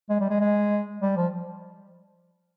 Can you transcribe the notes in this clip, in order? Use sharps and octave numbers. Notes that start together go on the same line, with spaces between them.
G#3
G3
G#3
G#3
G3
F3